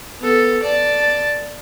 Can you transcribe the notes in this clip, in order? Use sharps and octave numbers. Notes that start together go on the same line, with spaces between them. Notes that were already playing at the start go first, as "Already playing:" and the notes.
B3 A4
D5 A5